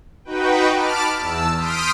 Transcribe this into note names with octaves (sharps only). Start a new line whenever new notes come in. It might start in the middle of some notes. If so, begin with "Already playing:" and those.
D#4 F#4 B4 G5
A5 B5 D6 F6 D7
E2 A5 E6
C6 D#6 F6 G6 B6 D7